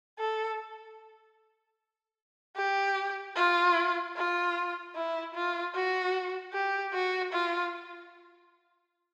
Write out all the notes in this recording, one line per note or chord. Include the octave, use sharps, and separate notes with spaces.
A4
G4
F4
F4
E4
F4
F#4
G4
F#4
F4